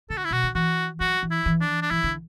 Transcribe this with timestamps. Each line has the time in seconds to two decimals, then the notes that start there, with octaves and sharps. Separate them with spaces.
0.10 D3 A4
0.17 F#4
0.25 E4
0.31 B2 F#4
0.43 D3
0.55 E3 F#4
1.00 F#3 F#4
1.23 E3
1.31 E4
1.46 E3
1.61 D4
1.82 D4
1.91 E3 E4
2.04 D3